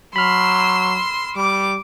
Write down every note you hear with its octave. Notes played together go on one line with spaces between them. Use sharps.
F#3 B5 C6 E6 F6
G3 D6